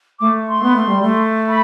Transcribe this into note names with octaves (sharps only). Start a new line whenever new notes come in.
A3 D6
C6
B3
A3
G3
A3
B5